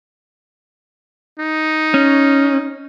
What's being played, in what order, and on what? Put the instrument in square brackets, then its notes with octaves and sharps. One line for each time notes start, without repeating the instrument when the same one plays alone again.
[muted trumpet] D#4
[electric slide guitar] C#4